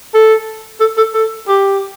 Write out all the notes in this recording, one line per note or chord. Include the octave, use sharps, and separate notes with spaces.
A4
A4
A4
A4
G4